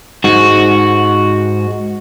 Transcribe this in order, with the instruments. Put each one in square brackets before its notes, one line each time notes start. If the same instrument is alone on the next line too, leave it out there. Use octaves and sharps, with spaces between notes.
[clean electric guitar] G#2 [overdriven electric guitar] F#4